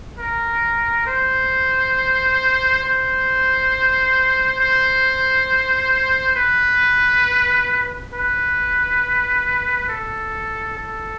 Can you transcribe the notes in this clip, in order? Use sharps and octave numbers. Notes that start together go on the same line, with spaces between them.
A#4
C5
C5
C5
B4
B4
A4
A4